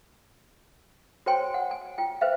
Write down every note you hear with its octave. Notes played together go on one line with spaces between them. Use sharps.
F#4 C5 C#5 G5 G#5 C6
F#5
G#5
F4 G5
B4 C5 E5 F5